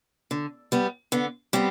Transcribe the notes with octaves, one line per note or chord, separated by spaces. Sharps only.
D3
G3 B3
D3 B3
G3 B3 C4